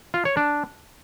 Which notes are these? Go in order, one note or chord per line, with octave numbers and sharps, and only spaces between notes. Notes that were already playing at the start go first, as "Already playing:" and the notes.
F4
C#5
D4